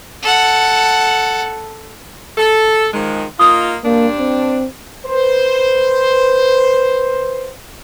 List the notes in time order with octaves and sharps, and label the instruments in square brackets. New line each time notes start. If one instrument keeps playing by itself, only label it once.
[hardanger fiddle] A4 F#5
[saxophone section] A4
D#3 F3 G#3
[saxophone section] A#3 D#4 F4 [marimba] D#6
[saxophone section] G2 D4 [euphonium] A#3
[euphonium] C4
[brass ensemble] B4 C5